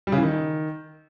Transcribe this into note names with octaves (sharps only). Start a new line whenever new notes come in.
G3
C#3
E3
D#3